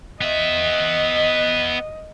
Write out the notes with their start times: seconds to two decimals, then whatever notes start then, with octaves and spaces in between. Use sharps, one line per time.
0.21 B3 D#5 E5